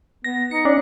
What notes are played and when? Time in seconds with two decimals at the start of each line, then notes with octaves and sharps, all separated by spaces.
0.24 B3 A#6
0.51 D#4 C#7
0.65 C#4 D4